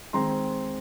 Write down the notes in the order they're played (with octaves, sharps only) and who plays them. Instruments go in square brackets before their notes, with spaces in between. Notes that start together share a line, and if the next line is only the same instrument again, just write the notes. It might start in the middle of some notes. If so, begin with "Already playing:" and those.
[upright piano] D#3 G#3 C4 A#5 C6